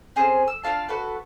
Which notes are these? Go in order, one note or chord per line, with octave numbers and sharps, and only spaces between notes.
C4 C#4 G#4 C5
E6
D4 F4 F5 A5
F#4 A4 B4 F#5